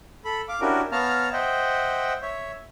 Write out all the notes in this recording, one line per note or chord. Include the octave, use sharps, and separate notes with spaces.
A4 B5
F5 D6
C#4 D4 E4 F#4 G4 A#4
B3 C#5 F5 A5 A#5 F6
C5 D#5 E5 F#5 G5
C#5 E5